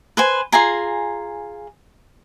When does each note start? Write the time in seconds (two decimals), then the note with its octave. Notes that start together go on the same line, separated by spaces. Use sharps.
0.17 B4 C5 G#5
0.52 F4 G#4 G#5 A#5